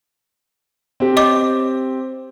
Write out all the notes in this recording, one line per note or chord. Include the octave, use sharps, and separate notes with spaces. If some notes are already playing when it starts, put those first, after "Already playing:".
C4 G4
C#5 D#5 D6